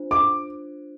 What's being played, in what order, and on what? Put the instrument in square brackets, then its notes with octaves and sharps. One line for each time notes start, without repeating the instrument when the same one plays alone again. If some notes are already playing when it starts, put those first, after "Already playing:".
Already playing: [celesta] D4 F4 C5
[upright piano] D6